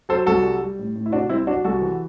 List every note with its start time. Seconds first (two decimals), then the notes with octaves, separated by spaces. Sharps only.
0.09 F#3 A4 C5
0.26 C2 F#4 A4
0.43 G3
0.62 G3
0.79 A2
0.95 A2
1.06 E4
1.12 C3 D4 F#4
1.29 C2 C4 E4
1.47 F#3 D4 F#4
1.64 C2 F#4 A4
1.82 E3